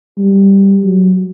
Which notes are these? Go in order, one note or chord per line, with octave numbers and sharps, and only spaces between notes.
G3
F#3